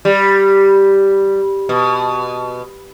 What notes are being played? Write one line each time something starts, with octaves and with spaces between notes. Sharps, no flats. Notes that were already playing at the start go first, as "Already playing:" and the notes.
G3
B2